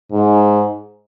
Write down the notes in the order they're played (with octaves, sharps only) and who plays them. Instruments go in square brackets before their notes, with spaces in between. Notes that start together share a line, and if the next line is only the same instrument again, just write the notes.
[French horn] G#2